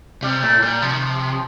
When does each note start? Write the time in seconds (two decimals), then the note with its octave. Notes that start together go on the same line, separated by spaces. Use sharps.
0.22 C3 G3
0.42 A#2 A3
0.56 A2
0.62 A#2 G3
0.82 C3 F3
0.92 D#3
1.02 F3
1.32 F3